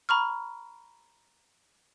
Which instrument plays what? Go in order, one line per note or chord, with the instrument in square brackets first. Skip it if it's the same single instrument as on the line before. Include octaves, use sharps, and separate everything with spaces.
[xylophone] A#5 B5 C#6 F6